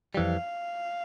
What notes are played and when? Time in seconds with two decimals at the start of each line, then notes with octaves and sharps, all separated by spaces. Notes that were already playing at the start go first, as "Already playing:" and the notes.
0.15 F2 E3 G3 F5